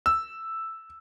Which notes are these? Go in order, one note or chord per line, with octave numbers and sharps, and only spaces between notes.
E6